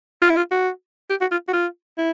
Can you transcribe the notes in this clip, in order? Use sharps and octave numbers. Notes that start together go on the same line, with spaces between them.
F4
E4
F4
F#4
G4
F#4
F4
F#4
F4
E4